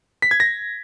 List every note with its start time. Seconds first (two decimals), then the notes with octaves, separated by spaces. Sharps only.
0.22 B6
0.31 G#6
0.40 A#6